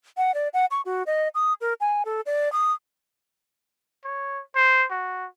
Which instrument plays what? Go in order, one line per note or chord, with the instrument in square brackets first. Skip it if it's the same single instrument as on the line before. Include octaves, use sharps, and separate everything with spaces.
[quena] F#5
D5
F#5
C#6
F#4
D#5
D#6
A#4
G#5
A4
D5
D#6
[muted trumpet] C#5
C5
F#4